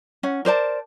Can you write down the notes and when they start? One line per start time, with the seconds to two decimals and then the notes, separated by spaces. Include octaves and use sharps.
0.23 C#4 F#5
0.45 A#4 C5 D5 A5